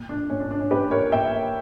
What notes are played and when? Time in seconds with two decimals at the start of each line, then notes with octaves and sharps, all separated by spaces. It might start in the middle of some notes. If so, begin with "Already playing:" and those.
Already playing: A#2
0.09 D4
0.29 A#2 C#4
0.40 D4
0.51 D4
0.60 C#4
0.71 A#2 G4 B4
0.91 A#4 C#5
1.12 A#2 E5 G5